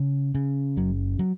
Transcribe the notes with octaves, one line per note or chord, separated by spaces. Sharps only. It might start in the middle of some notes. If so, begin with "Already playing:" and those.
Already playing: C#3
C#3
F#1 F#3
F#3